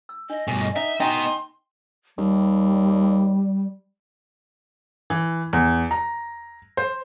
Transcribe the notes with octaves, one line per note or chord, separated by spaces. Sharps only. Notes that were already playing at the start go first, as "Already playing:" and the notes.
E6
D4 D#5 E5
G2 B2 G#5
D#4 E5 F#5
B3 D#4 D#5 G5 G#5 C6
D#2 G3
E3
E2
A#5
C5